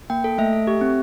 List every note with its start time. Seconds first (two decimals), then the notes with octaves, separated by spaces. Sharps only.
0.10 A#3 G5
0.24 A4
0.38 A3 E5
0.53 A4
0.67 G4
0.81 C4